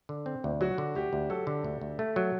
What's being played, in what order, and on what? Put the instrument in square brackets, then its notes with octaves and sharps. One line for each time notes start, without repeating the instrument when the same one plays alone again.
[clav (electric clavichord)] D3
C4
D2
[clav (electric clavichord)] F#3 [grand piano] F#4
[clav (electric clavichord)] D3
[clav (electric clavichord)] D2 [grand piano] G4
[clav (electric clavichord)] D2
[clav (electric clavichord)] F#3 [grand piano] A4
[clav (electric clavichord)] D3
D2
D2
A3
F#3